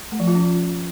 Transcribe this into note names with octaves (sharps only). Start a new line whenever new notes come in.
A3
F3
F4
C#4